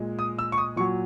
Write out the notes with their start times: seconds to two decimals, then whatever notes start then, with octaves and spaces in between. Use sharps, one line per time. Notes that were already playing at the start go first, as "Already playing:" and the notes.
Already playing: A#2 G#3
0.19 D#6
0.39 E6
0.52 C#6
0.58 D#6
0.76 A#2 F#3 C#6